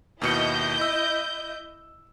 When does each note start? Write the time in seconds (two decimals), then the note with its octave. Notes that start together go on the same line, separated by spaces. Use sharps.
0.22 D#2 B2 E4 D#5 G6 C#7
0.81 E6